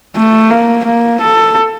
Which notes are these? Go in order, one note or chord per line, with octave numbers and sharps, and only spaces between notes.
A3
A#3
A#3
A4